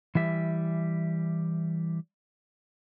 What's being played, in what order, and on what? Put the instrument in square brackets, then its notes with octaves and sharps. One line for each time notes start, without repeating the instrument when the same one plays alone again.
[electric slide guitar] E3 G3 E5